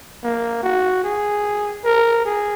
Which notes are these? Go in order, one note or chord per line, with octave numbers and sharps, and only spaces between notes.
A#3
F#4
G#4
A#4
G#4